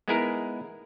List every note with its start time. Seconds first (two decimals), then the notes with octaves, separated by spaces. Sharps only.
0.08 G#3 B3 D#4 E4 G#4 A#4